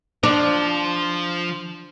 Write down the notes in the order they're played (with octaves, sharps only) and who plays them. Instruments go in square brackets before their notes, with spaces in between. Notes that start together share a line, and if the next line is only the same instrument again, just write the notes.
[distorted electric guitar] F3 [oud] D4